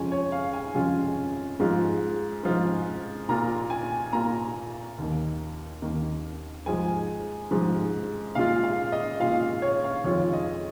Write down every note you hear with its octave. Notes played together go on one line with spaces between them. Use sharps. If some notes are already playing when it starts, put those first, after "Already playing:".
Already playing: F2 C#3 G#3 C#4 F4 G#5
C#5
F5
G#5
F2 C#3 G#3 C#4 F4
G#2 F3 G#3 F4
G#2 F3 G#3 F4
A#2 A#3 F4 A#5
G#5
A#2 A#3 F4 A#5
D#2 D#3 A#3
D#2 D#3 A#3
G#2 F3 G#3 G#5
G#2 F3 G#3
A#2 G#3 F4 F5
F5
D#5
A#2 G#3 F4 F5
C#5
F5
F2 D#3 G#3 F4 C#5
D#5